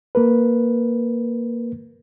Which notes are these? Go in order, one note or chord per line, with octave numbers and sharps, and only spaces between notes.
A#3 A#4 B4